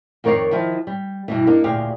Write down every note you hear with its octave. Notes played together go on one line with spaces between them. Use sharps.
F2 D#3 A#4 C#5 D5 F5
D#3 F3 E4
G3
G2 B2 E3
A#3 D4 D#4
D2 A#2 G4 G#4 F5